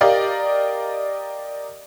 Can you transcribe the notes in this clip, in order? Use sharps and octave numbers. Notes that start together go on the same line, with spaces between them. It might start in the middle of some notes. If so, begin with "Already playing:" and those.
G4 A#4 D5 D#5 F5